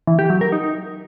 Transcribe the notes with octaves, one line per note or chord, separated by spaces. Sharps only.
E3
G4
F#3
A#4
D#4